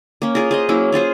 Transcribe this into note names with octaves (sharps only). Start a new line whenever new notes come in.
A#3 C#4
F4 G#4 A#4
G#4 C5 D#5
F#3 A#3 C#4 E4
C#4 F4 G#4 C5